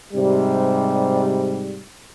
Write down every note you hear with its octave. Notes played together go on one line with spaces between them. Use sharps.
G#2 C3 G3